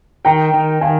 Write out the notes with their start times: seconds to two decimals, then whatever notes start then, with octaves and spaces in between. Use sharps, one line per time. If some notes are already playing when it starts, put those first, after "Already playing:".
0.25 D#3 G5 A#5
0.54 D#3
0.81 D#3 F5 G#5